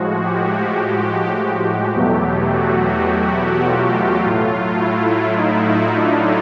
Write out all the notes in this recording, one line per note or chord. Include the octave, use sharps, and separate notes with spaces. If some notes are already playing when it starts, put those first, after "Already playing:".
Already playing: A2 F3 G#3 F#4
G4
E2 B2 F#3 A3
F#4
G4
F4
A2 F#3 A3 F4
E4
D#4
D4